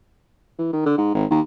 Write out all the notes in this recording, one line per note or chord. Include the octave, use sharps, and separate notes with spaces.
E3
D#3
D3
G#2
G#1
D#2